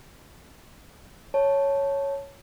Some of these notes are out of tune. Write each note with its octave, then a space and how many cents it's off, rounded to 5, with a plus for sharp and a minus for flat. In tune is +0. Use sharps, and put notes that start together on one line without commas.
C#5 +0 A5 +0